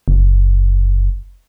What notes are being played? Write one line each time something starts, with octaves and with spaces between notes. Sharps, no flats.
F#1